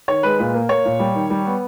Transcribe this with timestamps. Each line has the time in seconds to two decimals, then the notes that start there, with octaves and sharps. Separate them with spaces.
0.08 D#3 C#5
0.23 G#3 B4
0.39 A#2 B4
0.54 A#3
0.69 A#3 C#5
0.85 A#2
0.99 G3
1.15 D#3
1.30 G3
1.46 B3